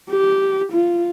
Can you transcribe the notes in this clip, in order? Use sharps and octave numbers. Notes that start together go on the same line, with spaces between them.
G4
F4